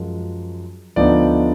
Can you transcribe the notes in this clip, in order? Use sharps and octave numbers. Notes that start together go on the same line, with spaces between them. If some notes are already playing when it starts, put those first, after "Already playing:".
Already playing: F#2 F3 G#3
D2 D3 F3 B3 D#4 D5